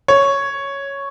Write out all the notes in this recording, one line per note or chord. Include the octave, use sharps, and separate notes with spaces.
C#5